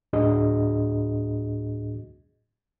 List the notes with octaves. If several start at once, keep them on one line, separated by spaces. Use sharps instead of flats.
D2 A2 D4 F#4 G#4 D#5